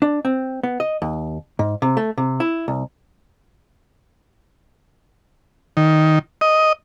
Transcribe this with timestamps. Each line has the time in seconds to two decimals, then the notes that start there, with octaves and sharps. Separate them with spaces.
0.02 D4
0.25 C4
0.63 B3
0.80 D#5
1.02 D#2
1.59 G#2
1.82 C3
1.97 A3
2.18 C3
2.40 E4
2.68 C2
5.77 D#3
6.41 D#5